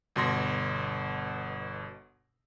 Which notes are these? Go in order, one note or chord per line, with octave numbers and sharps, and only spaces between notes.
G1 B2 C6 A#6